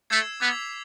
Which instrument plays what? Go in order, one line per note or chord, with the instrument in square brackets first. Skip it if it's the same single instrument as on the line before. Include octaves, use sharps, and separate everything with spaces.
[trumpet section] A3 [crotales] E6 G#6 C7 E7
[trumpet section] B3 [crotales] D6 G#6 B6 F7